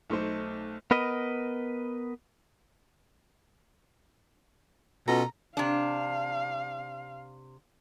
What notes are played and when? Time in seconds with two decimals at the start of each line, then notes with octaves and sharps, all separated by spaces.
0.10 B1 A3 D#4 C5
0.91 B3 A#4 B4 D#5
5.08 B2 C#4 F4 A4 A#5
5.57 C3 D4 F5